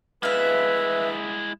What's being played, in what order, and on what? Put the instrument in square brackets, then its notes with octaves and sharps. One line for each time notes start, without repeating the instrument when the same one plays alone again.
[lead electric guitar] G#3 E4 [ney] B4 [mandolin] E5 F5